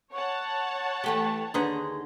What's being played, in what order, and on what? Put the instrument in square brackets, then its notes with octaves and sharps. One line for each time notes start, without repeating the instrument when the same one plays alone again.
[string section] C#5 F#5 A5 [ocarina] C#6
[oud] E3 A3 G4 [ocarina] G5
[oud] D#2 G#4 B4 [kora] D3 D#4 [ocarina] C6